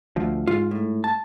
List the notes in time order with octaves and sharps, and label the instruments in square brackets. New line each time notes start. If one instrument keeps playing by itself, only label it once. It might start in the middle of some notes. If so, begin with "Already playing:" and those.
[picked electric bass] D2 F3
[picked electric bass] G#2 [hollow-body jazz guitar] F4
[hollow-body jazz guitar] A2
A5